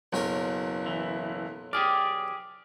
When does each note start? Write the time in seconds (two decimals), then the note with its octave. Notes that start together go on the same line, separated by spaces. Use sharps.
0.13 F#1 B1 C#4 A#4
0.86 E3
1.73 G4 G#4 D5 F6